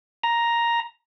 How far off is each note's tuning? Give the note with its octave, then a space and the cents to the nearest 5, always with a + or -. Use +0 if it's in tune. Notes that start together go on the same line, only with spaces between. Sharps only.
A#5 +5